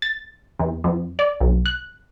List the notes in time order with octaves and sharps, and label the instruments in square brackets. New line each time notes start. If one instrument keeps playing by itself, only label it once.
[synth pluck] A6
E2
F2
D5
B1
F#6